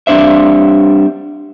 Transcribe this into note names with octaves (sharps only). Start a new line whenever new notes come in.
G3 C4 D4 C5 E5